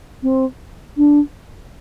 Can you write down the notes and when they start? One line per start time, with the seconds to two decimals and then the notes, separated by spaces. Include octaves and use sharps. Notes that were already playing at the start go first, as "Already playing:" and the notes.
0.22 C4
0.97 D4